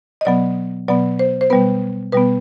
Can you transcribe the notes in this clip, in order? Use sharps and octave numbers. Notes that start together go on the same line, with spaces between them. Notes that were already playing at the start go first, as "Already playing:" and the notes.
D#5
B2 F#3 B3 D5
B2 F#3 B3 D5
C5
C5
B2 G3 B3 B4
B2 G3 B3 B4